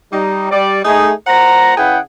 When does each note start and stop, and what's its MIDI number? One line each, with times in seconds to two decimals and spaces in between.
0.12 0.49 55
0.12 0.49 63
0.51 0.80 55
0.51 0.80 74
0.85 1.12 57
0.85 1.12 63
0.85 1.12 68
1.27 1.76 46
1.27 1.76 72
1.27 1.76 78
1.27 1.76 82
1.77 1.99 49
1.77 1.99 64
1.77 1.99 68
1.77 1.99 71
1.77 1.99 78
1.77 1.99 79